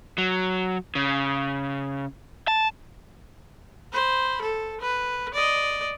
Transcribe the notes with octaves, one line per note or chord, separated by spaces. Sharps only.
F#3
C#3
A5
C5 B5
A4
B4
D5 D#5